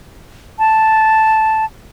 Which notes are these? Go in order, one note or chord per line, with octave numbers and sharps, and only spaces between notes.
A5